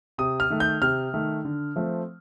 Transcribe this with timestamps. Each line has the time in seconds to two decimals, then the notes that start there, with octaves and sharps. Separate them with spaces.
0.18 C3 D#6
0.40 F6
0.50 D#3 A3
0.60 G6
0.82 C3 F6
1.14 D#3 A3
1.45 D3
1.76 F3 A3 C4